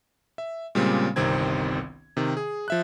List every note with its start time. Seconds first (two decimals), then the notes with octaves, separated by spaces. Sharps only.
0.38 E5
0.75 A#2 C#3 G3 G#3 C4
1.16 G1 C2 C3 D#3 C4 G#6
2.17 C3 D#3
2.37 G#4
2.68 F3 E5 F#6